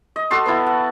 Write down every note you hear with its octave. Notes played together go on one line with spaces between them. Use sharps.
D#5
F#4 A4 A5 C6
B3 E4
F#5